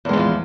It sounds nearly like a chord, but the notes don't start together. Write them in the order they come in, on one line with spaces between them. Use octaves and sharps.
E2 G#3 E3 F3